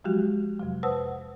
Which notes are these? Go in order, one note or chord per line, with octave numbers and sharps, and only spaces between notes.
F3 F#3 G#3 F#4 G4
F2 C3 F#3
B4 C5 F#5 A5 D#6 E6